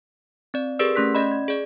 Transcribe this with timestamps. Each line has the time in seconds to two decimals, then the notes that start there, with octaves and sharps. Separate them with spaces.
0.54 C4 D5
0.79 G4 G#4 A#4 B4 D5 E6
0.96 A3 C#4 C6 F#6 B6
1.15 C#4 D5 D#5 B5
1.32 G#6
1.48 G#4 D5